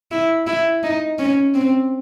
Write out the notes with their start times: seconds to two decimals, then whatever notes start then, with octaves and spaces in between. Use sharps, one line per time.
0.11 E4
0.47 E4
0.83 D#4
1.19 C#4
1.54 C4